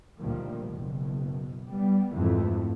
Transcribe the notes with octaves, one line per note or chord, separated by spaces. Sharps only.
D2 A#2 D#3 F3 G3
F#1 B2
G3 B3
F2 G#2 E3 F3 A3